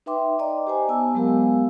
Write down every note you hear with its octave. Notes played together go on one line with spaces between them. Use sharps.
D#4 B4 E5 G5 C6 D6
D5 D#5 G5 A#5 D6
G4 C5 G#5
B3 G#5 A5 E6
F#3 G#3 B3 G4 A#4 F5